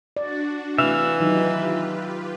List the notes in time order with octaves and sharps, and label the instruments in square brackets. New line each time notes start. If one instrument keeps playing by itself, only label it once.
[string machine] D4 F#4 [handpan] D5
[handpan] C3 A3 [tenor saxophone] E3 [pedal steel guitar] E5 F5
[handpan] D#3 F#3 D#4 [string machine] F4 G4 B4